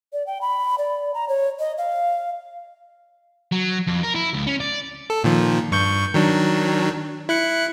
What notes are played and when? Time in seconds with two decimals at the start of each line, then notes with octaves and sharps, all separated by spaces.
0.13 D5
0.27 G5
0.41 B5
0.78 D5
1.14 A#5
1.29 C#5
1.59 D#5
1.78 F5
3.52 F#3
3.87 F2
4.03 A#4
4.15 E4
4.33 C#2
4.47 C#4
4.60 D5
5.10 A4
5.24 A#2 D#3 F3
5.72 G2 C#6 G6
6.14 D#3 F#3 D4
7.29 E4 F#6 C#7